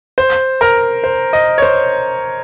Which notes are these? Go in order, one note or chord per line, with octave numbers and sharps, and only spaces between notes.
C5
A#4
C5
D#5
C#5
C5